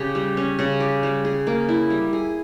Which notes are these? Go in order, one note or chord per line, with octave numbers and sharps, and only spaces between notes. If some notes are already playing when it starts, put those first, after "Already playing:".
Already playing: C#3 G4
G3
C#4
C#3
G4
G3
G#4
A#3
E4
G3
G#4